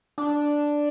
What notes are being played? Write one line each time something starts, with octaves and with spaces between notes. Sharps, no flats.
D4